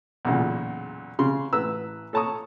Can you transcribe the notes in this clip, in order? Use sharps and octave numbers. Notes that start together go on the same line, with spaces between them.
B1 E2 A#2 C#3
C#3 C6
A1 B4 A#5 E6
A4 C#5 A5 A#5 C#6 D#6